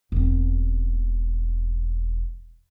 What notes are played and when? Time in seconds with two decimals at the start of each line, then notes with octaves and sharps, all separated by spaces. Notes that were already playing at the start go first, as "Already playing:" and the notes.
0.12 E1 C4